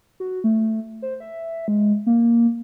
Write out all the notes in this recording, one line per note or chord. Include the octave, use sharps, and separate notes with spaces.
F#4
A3
C5
E5
G#3
A#3